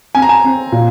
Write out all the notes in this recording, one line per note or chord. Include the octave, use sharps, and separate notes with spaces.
C4 G#5
A#5
G#5
C4
A#2